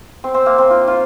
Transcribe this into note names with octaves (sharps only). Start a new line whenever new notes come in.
C4
C4
A#3
C4
F4
F4